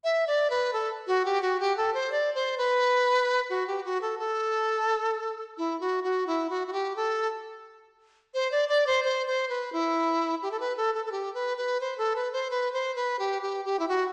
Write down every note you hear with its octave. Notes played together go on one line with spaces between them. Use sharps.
E5
D5
B4
A4
F#4
G4
F#4
G4
A4
C5
D5
C5
B4
F#4
G4
F#4
A4
A4
E4
F#4
F#4
E4
F#4
F#4
G4
A4
C5
D5
D5
C5
C5
C5
B4
E4
G4
A4
B4
A4
A4
A4
G4
B4
B4
C5
A4
B4
C5
B4
C5
B4
G4
G4
G4
E4
F#4